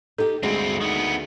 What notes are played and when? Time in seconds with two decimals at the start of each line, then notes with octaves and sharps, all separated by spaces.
0.18 D#4 G4 A4
0.43 D2 G2 G#3 C4 F#4
0.81 D#3 B3